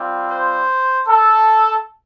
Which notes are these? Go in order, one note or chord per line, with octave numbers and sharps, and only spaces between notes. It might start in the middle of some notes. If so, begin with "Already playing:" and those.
Already playing: G3 C4 F4
C5
A4